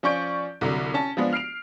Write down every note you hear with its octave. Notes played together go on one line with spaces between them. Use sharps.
F3 C#4 D5 C#6 G6 D7
C2 D3 F#3
C#4 A5
F3 G#3 B3 D4
F6 C7 D7 F7